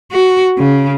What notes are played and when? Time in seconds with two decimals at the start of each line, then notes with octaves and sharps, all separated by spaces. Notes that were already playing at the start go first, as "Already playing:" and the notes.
0.12 F#4
0.58 C#3